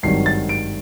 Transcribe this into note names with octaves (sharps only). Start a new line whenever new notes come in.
G#1 G2 D#3 F#3 C7
A6
D7